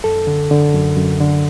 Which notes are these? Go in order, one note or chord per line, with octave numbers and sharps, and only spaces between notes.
F#2 A4
D3
D3
F#2
F#2
D3